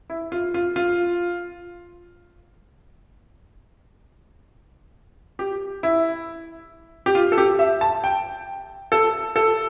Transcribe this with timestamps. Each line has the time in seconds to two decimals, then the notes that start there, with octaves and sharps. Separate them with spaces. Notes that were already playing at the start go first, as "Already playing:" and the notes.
0.10 E4
0.32 F4
0.54 F4
0.76 F4
5.39 G4
5.83 E4
7.06 G4
7.15 F4
7.32 A4
7.38 G4
7.59 E5
7.81 A5
8.04 G5
8.92 A4
9.36 A4